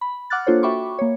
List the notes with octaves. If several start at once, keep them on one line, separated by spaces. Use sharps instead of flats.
B5
F#5 D6 F6 F#6 A6
A#3 D4 F4 A4 C5 C#5
F#4 E5 G5 B5 C#6 D6
A#3 C#5